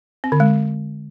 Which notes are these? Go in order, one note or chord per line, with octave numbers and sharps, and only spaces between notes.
C4
D3
G#3